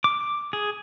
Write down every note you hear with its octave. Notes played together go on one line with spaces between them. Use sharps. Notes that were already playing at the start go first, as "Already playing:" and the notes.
D6
G#4